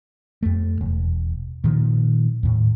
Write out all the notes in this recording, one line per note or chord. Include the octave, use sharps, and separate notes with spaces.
F2 A3
E1
A#2 D#3 F3
D#2 A2